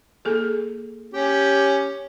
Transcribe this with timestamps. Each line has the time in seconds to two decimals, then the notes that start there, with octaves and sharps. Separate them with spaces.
0.25 A#3 G#4 A4
1.14 C#4 G4